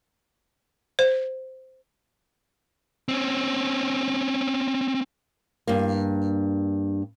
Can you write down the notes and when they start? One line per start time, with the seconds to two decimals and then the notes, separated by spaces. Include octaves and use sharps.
0.99 C5
3.09 C4 C#4
5.67 G2 A#3